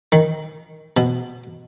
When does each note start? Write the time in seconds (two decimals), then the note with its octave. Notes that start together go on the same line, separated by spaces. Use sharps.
0.12 D#3
0.97 B2